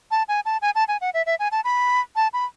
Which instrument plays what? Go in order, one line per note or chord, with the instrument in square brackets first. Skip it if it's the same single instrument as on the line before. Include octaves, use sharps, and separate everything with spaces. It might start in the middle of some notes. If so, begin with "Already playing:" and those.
[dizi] A5
G#5
A5
G#5
A5
G#5
F#5
E5
E5
G#5
A5
B5
A5
B5